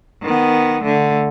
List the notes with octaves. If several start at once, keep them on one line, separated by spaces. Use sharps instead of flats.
D#3 B3
D3 A3